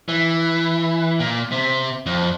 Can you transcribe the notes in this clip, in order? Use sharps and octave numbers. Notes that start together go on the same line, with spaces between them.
E3
A#2
C3
F2